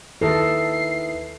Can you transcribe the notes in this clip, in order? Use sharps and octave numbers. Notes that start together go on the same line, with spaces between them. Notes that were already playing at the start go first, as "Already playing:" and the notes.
D#2 D#3 E4 A4 B4 D#5 E5 C7